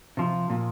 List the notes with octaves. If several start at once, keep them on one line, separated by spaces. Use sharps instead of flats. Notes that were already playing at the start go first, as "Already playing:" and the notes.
C3 F3
A#2 F3